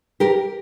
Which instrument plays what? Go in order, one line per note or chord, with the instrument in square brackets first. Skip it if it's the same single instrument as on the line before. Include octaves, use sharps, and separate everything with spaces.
[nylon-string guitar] G4 A#4